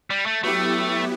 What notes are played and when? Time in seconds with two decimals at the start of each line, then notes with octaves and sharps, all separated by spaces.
0.10 G3
0.26 A3
0.43 F#3 A3 B3 E4 G4